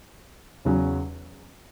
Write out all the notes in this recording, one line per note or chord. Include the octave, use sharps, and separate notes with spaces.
E2 C#3 F#3 C#4